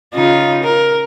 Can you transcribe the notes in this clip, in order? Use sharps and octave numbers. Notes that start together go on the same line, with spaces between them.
C#3 D#4 F4
A#4